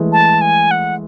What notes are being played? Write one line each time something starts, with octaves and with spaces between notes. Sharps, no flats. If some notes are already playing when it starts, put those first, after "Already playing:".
Already playing: E3 G#3 A3
A5
G#5
F#5